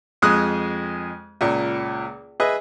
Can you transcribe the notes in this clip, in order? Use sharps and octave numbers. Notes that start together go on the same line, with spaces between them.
F2 G#3 D#6 F#6
C#2 A#2
G#4 B4 D#5 E5